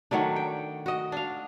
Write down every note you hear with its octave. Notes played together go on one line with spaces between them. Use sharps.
D#3 F#3 A3 D4
G5
F#4 D#5
D4 F5